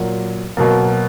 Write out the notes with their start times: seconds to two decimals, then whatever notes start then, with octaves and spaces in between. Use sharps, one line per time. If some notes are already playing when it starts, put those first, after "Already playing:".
Already playing: A#2 F#3 A#3
0.57 B2 F#3 A#3